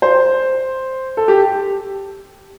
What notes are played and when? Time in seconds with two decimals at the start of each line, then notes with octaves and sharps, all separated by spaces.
0.02 C5
1.17 A4
1.28 G4